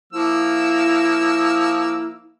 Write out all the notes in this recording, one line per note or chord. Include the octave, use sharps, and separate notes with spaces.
F3 A#3 E4 E6